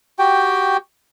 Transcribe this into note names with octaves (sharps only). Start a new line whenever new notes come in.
F#4 G4 G5